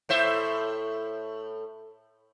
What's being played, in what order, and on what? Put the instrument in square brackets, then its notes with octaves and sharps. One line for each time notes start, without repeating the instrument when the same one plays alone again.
[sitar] A2 C5 E5